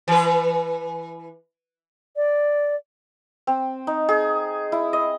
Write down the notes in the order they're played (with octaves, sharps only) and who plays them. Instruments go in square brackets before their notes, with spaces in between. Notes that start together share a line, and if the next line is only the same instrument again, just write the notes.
[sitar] E3 B4
[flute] D5
[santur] C4
D#4
G#4
E4
D#5